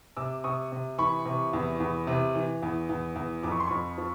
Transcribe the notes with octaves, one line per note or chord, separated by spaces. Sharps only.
C3 D6 E6
C3 C#6 D#6
C3
E3 B5 C#6
C3
E2
E2
C3
E3
E2
E2
E2
F2 D6
C#6
C6
F2 B5 C#6
F3